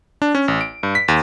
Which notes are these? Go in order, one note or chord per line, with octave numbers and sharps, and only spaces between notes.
D4
C#4
A1
D7
G2
B6
D#2